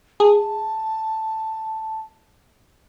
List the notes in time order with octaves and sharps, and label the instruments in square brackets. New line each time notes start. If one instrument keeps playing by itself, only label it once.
[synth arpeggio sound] G#4 [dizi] A5